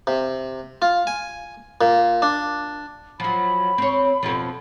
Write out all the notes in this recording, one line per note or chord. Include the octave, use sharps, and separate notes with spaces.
C3
F4
G#5
A#2
D4
F3 F#3 B5
C4 C#5
F2 B2 F3